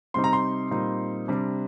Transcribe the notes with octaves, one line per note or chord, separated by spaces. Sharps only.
C3 G3 C4 D#4 C6
A#5
C6
A#2 G3 C4 D#4
C3 G3 D4